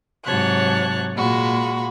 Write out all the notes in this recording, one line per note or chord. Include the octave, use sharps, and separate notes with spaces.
G#2 C3 F#3 C#5 A5 F#6
A#2 G#3 F#4 B5